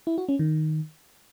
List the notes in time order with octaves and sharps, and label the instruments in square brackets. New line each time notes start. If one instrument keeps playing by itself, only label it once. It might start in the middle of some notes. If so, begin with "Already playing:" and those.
[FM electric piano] E4
F#4
C#4
D#3